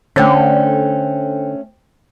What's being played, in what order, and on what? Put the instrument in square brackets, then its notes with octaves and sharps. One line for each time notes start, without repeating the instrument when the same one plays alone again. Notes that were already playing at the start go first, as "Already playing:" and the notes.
[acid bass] D3 [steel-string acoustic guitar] A3 C#4 [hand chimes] C5 G5